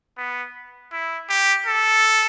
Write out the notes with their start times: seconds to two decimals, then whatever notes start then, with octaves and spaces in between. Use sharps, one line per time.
0.17 B3
0.92 E4
1.29 G4
1.66 A4